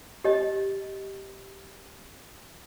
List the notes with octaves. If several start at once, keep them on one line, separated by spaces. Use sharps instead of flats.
G4 D#5